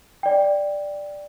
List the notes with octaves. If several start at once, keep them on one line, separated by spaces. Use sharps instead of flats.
D5 G5